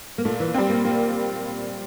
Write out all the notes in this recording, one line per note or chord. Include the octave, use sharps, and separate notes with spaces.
A#3
A#2 A3
E3
G3 C4
A#3
A#2 A#3